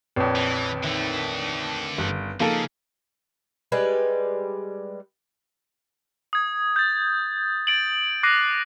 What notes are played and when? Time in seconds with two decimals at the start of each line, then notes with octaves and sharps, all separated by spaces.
0.16 A#1 F2 C4 B4 C#5
0.36 E3
0.84 D3 D#3 A3 E5
1.98 G1
2.40 C#3 F3 A#3 D#4 G#4 A4
3.72 G3 G#3 B4
6.33 D#6 G#6
6.76 G6 A6
7.67 A6 D7 F#7
8.23 D6 F#6 A#6 C7 D#7